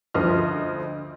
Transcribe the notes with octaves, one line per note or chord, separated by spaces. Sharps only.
D2 F3 D#5 F6